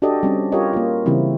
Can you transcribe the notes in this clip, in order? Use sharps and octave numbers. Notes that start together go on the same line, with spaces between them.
D4 F#4 G4 A4 D5 D#5
G3 C4 C#4
F4 G4 A#4 C#5 D#5
A#3 F4
C#3 E3 G3 C4 E4